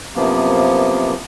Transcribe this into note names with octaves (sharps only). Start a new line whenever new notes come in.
F#2 C3 F3 A#3 B3